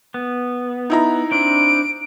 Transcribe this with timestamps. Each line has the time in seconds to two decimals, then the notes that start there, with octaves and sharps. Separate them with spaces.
0.14 B3
0.90 D#4 E4 A#5
1.31 C4 D4 D7